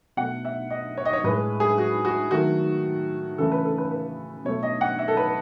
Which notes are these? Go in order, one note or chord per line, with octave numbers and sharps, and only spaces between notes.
B2 A3 F#5
E5
D#5
C#5
D#5
C#5
A2 G#3 B4
G#4
F#4
F#4
D#3 F#3 A3 F#4
C#3 E3 A3 A4
B4
A4
B4
B4
B2 A3 C#5
D#5
F#5
E5
A4
B4